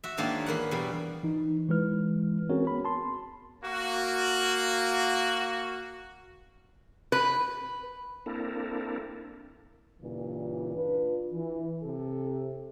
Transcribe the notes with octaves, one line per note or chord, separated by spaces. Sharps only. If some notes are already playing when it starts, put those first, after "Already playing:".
F#4 E5
G#2 D#3 A#3 D4 C#5 A5
E2 A#3 B4 F#5
E2 B2 G3
E3 D#4
E3 G#3 E4 B4 F6
C4 C#4 F#4 G#4 A#4 C#5
B3 B5
A5 C6
A#3 F#4
B4
A#3 C4 D4 E4 A4 A#4
G2 A#2 C#3 E3
D4 F4 B4
E3
C3 A4